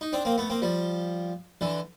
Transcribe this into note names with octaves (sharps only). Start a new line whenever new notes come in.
D#4
C4 D4
A#3 C4
A3 B3
A#3 C4
F3 G3
D3 E3